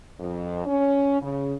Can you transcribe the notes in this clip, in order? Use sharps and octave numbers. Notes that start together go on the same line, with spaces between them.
F2
C#4
C#3